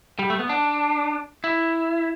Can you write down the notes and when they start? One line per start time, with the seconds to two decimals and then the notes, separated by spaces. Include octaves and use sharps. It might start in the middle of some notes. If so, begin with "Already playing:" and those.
0.19 G3
0.30 A3
0.39 B3
0.49 D4
1.44 E4